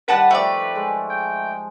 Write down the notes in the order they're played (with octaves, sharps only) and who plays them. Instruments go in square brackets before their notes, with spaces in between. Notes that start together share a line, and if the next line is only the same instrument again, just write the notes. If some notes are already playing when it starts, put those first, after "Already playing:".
[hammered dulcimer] D#3 G3 [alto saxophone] B4 [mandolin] F#5 A5 F#6
[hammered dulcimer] F3 G5 A5 [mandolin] A3 D5
[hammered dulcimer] G#3
[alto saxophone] G5